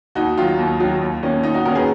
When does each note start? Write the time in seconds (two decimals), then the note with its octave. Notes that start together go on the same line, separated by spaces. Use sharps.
0.15 D#2 D#4 F#4
0.37 D#3 F#3 F4
0.59 D#2
0.80 D#3 F#3
1.01 D#2
1.22 D#3 A#3 C#4
1.43 D#2 D#4
1.54 D#4 F#4
1.65 D#3 A#3 C#4 F#4 A#4
1.75 G#4 B4